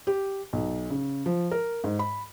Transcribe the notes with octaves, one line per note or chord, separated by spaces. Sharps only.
G4
B1
C#3
F3
A#4
G#2
B5